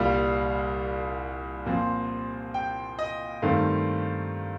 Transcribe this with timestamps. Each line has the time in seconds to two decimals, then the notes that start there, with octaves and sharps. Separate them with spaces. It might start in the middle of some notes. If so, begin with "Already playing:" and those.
Already playing: C2 A#2 G3 F5
1.65 A#2 F3 C4
2.54 G5
2.99 D#5
3.42 G2 D#3 A3 C4 F5